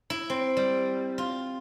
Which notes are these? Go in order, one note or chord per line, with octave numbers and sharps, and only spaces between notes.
E4
C4
G3
F4